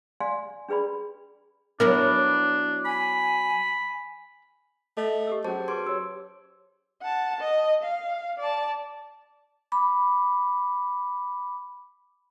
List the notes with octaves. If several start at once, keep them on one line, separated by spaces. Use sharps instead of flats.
D5 F5 G#5 C6
D4 G#4 B4 D5 B5
F#3 B3 D4 E4 A#4
G#5 B5
A3 A4 D#5
G4 A4 E6
F#3 C#4 G#4 C5 A5
G#4 B4 C6 D6 G#6 D7
G4 C#5 E6
F#5 A5
D#5
F5
D5 A5
B5 D6